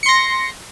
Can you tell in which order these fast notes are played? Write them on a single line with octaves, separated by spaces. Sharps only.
C#7 C6 A#6